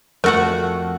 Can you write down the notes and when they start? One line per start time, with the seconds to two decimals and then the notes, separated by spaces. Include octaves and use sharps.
0.24 F2 A3 F#4 A#4 F#5